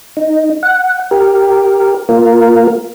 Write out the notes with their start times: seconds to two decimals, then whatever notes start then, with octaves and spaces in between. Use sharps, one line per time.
0.17 D#4
0.63 F#5
1.11 G4 A#4
2.09 A#3 F4 A#4